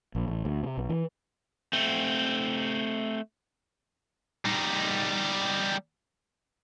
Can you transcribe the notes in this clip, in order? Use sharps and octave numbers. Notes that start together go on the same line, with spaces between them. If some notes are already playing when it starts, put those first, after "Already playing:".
A#1
A1
D2
C3
B1
E3
A3 C4
G3 D#4